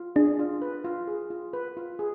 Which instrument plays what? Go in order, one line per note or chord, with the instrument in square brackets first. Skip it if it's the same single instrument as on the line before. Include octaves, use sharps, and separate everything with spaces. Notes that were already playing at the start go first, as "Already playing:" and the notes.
Already playing: [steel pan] F4
[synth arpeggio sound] D4 [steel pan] G#4
[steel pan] F4
B4
F4
G#4
F4
B4
F4
G#4